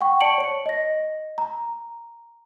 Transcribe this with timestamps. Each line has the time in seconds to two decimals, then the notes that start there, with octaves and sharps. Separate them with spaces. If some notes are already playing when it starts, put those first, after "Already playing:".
0.01 F#5 G5 C#6
0.21 D5 A5 C#6 C#7 D7 F#7
0.38 C#5 C#7
0.66 D#5 A#6
1.38 A#5